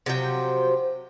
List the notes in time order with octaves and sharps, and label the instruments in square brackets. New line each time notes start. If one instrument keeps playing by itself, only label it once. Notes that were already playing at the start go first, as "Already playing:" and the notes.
[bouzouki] C3 F3 F#3 G5